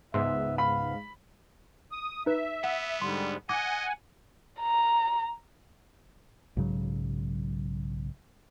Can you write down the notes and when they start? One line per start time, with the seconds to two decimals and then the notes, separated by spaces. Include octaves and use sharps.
0.14 C#2 G#2 B3 E5 C6
0.58 F5 B5
1.92 D#6
2.26 D#4 B4 E5
2.64 B3 F#5
3.02 G#2 D3 G3 C6
3.49 D#5 F#5 G#5 D6 G#6
4.61 A#5
6.57 B1 G#2 C#3 F#3